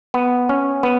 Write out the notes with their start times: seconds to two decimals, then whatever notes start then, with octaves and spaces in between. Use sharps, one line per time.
0.14 B3
0.49 C#4
0.83 B3